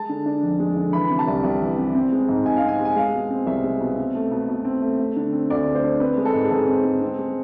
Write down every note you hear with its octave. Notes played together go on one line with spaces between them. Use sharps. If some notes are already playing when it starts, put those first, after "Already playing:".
Already playing: G#3 A5
D3
D4
F2
G#3
D3
E3 B5
C3
A5
C2
C2
E3
C3
C4
G#3
G#2
G#2 G#5
F5
C4
G#5
G#3
G#5
G#3 F5
B2
C4
C2 E5
G#3
B2
C4
A3
B2
B2
C4
A3
A3
D3
C4
D2 D5
A3
C5
D3
C4 B4
G#3
A4
G#2
G#4
G#2 A4
C4
G#3
C4
G#3